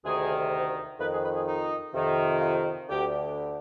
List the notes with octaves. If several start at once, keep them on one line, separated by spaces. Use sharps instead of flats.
D2 C3 D#3 G#4
F2 D#3 B4
G#4
B4
G#4
D#4
F2 C3 D#3
F4
D2 D3 G4